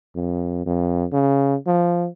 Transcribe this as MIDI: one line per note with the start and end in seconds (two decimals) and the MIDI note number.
0.15 0.63 41
0.66 1.05 41
1.13 1.56 49
1.67 2.08 53